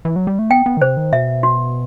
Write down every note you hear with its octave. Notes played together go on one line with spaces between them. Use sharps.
E3
F#3
G3
A3
B3 G5
B3
D#3
C3 C5
D#3
B2 E5
F#4